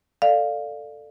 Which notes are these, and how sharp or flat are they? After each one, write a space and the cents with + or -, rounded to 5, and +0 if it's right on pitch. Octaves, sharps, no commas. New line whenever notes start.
A4 +15 D5 +15 F5 +0